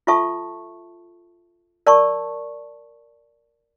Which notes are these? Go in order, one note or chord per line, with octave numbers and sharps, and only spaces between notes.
F4 A4 E5 A5 C#6
A#4 D5 A5 C#6